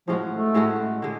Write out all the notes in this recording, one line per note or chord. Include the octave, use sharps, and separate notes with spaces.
A2 F3 G#3 C#4 F#4
A3
A2 G#3 C#4 F#4
D3 G#3